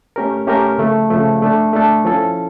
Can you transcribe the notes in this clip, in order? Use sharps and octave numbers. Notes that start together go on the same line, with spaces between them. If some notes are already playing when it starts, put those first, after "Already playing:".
A3 C#4 G4 A#4
A3 C#4 G4 A#4
C#3 F3 A3
C#3 F3 A3
A3 D4 A4
A3 D4 A4
F3 C#4 E4 A4